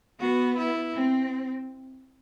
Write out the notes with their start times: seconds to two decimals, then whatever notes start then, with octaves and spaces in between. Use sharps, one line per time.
0.20 B3 F#4
0.57 E4
0.95 C4